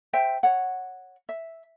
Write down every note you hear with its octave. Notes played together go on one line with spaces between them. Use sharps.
C5 E5 G5
C#5 F#5
E5